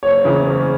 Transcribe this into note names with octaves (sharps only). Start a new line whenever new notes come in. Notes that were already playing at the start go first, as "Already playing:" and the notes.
F#1 C#5
E2 C#3 E3
F#1